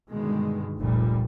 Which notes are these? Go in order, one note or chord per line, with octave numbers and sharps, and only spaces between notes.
G2 B2 D3 D#3 G#3
F1 C#2 A#2 G3